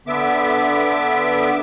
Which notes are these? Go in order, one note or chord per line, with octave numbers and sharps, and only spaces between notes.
D3 B3 E5 D6